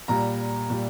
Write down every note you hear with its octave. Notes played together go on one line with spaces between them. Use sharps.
A#2 G3 A#5
A#2 G3